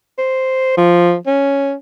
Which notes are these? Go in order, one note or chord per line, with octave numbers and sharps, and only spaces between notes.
C5
F3
C#4